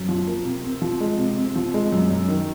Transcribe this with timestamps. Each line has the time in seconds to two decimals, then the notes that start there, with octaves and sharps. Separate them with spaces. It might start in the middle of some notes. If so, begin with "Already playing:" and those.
Already playing: F#2
0.09 F3
0.27 A#3
0.45 C3
0.64 C4
0.82 F3
1.01 G#3
1.18 C3
1.37 C4
1.56 F3
1.74 G#3
1.92 F#2
2.10 F#2
2.28 D#3